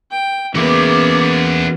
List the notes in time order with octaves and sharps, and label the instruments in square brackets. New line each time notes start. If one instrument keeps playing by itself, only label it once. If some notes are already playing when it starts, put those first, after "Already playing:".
[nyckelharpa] G5
[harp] E3 G#3 C#4 [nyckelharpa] A#3 B3 [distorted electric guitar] F#4 E5 [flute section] D6